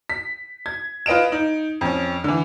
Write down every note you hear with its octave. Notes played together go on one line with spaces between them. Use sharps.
B6
G#6
F4 B4 D#5 D7 E7
D#4
F2 C#4
D3 E3